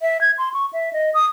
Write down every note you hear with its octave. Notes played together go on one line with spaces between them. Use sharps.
E5
G#6
C6
C#6
E5
D#5
D#6